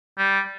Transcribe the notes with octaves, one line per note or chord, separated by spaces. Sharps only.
G3